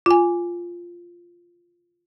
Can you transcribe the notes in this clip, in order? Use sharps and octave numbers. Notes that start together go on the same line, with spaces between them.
F4 G#5